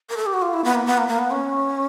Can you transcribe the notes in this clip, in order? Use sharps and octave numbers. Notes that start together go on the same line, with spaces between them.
A#4
A4
G4
F#4
F4
E4
B3
A#3
B3
A#3
A#3
B3
C#4